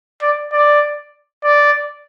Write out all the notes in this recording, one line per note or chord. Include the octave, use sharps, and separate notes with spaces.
D5
D5
D5